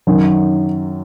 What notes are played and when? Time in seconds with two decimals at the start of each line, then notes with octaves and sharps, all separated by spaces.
0.07 F#2 D#3 F#3